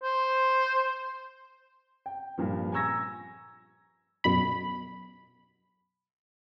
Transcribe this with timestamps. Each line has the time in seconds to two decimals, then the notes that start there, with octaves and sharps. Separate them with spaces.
0.03 C5
2.06 G5
2.38 G2 A#2 F3
2.72 G#5 A#5 C#6 E6 G#6 A#6
4.24 F#2 B2 B5